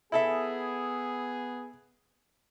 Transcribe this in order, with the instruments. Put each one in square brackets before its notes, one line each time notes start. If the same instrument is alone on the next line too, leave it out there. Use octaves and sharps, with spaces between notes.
[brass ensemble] B3 G#4 [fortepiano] E4 A4 E5